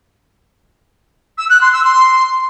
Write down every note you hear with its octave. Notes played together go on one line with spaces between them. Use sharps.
E6
F#6
C6
E6
C6